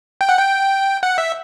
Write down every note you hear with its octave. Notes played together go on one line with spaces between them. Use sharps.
G5
F#5
G5
F#5
E5